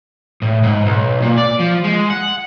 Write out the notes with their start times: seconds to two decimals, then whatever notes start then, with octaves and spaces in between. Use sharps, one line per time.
0.42 A2
0.63 G#2
0.86 B1
1.22 A#2
1.38 D5
1.60 F3
1.84 G#3
2.10 F#5